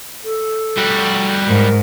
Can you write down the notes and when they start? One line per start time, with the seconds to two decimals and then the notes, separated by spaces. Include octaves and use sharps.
0.24 A4
0.77 G3 F#4
1.48 G#2 A#4